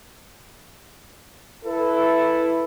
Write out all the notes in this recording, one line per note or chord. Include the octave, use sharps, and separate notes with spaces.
E4 A4 B4